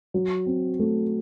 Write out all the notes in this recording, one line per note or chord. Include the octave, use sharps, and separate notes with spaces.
F#3
C4
A3